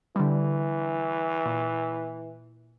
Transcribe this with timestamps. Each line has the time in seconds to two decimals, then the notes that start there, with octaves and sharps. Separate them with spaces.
0.16 D3 E3 G3
1.45 A#2